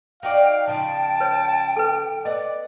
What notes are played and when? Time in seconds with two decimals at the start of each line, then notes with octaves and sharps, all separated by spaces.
0.23 D#4 F#4 D5 F5 G5
0.67 C#3 F3 G5 A5
1.20 B4 C#5
1.76 A4 B4
2.25 B3 D5 D#5